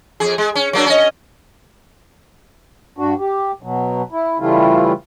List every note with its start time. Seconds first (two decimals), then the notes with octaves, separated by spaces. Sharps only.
0.20 F2 G#4
0.38 G#3
0.55 C#4
0.73 F#3 A#3 D4
0.86 C#4 D#5
2.98 G2 D4 F#4
3.19 G4
3.62 B2 F#3
4.12 E4
4.40 C#3 E3 G3 A3 E4 F4